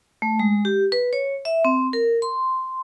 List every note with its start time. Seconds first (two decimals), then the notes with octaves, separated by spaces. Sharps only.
0.22 A3
0.39 G#3
0.65 G4
0.92 B4
1.13 C#5
1.45 E5
1.65 C4
1.93 A#4
2.22 C6